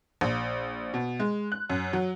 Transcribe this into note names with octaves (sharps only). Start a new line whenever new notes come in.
A#1
B2
G#3
F#6
F#2
F#3